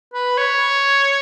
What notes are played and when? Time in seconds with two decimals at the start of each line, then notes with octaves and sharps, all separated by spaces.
0.14 B4
0.38 C#5